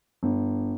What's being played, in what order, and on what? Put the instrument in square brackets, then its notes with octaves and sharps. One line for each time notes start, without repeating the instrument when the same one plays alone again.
[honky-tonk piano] G1